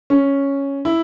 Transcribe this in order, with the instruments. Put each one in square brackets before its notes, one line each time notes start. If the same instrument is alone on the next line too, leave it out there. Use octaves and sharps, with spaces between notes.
[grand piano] C#4
E4